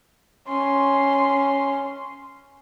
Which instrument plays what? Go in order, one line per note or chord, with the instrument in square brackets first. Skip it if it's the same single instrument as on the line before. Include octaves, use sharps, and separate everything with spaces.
[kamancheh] C#4 C6